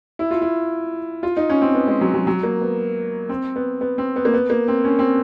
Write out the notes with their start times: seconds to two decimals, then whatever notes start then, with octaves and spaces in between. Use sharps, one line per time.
0.19 E4
0.31 F4
0.42 E4
1.23 F4
1.37 D#4
1.50 C#4
1.62 C4
1.75 B3
1.87 G#3
2.01 F#3
2.14 F#3
2.27 F#3
2.43 A#3
2.62 B3
3.29 C4
3.56 B3
3.81 B3
3.98 C4
4.16 B3
4.25 A#3
4.34 B3
4.50 A#3
4.68 C4
4.85 C#4
4.99 C4